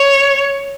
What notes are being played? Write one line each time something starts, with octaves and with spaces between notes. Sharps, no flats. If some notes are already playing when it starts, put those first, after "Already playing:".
Already playing: C#5